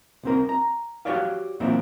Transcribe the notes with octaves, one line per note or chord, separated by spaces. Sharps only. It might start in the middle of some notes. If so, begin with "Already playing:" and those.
C2 C4 A#4
A#5
F#4 G4 C#5 D5 F5
E2 A#2 F#3 A#3 C4 E4